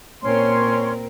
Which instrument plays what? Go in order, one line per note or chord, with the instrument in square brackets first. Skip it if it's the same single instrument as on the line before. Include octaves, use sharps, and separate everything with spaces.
[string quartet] A#2 C4 A#4 [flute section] C#4 C#5 C6